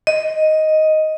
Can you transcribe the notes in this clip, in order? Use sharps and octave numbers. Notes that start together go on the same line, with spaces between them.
D#5